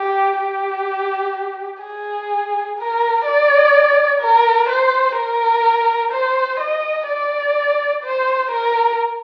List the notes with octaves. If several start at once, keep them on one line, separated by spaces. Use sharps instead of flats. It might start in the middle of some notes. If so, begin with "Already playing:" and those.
Already playing: G4
G4
G#4
A#4
D5
A#4
C5
A#4
C5
D#5
D5
C5
A#4